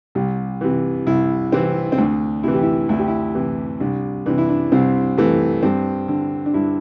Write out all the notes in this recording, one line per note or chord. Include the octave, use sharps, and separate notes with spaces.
C2 G3
C3 E3
C2 E4
C3 E3 C4
C4
D2 D4
C3 E3 E4
G4
E4
D2 E4
G4
E4
C3 E3
C2 D4
C3 E3 D4
E4
D4
C2 C4
C3 E3 A3
G2 C4
D3
D4
G2 E4